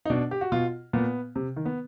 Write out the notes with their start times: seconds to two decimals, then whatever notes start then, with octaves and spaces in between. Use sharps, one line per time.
0.05 D#4
0.10 B2 D4
0.31 G4
0.41 F#4
0.52 B2 F4
0.93 A#2 B3
1.36 C3
1.56 D#3
1.65 B3